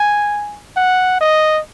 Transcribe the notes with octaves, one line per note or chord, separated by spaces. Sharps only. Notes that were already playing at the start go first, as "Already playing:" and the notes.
Already playing: G#5
F#5
D#5